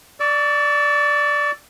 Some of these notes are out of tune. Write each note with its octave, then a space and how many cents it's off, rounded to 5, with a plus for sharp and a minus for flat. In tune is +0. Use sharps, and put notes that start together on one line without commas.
D5 +0 C#6 +40 E6 +10